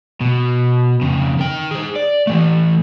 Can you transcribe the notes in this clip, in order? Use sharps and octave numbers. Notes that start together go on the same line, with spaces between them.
B2
F2 C#3
D#3 G5
G#4 C5
D5
E3 A3